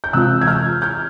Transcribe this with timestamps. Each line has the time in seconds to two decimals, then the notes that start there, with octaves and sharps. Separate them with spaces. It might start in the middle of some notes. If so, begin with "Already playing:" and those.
0.04 G6
0.13 C3 E3 G#3 C4 F4 E6 F#6
0.41 G#6
0.47 F6 G6
0.82 F6 G6